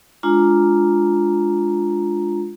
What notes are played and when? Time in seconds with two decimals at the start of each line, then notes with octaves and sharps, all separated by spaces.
0.23 G#3 D4 F4 A#5